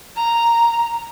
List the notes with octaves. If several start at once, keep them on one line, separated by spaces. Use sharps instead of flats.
A#5